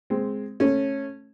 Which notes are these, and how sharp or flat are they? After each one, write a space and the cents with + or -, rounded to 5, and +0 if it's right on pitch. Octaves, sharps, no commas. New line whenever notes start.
G#3 +0 C4 +0
A3 +0 C#4 -15